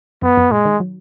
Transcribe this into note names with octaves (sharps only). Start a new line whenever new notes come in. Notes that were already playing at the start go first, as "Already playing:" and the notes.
F#2 B3
F#2
A#2 G#3
D#3
F#3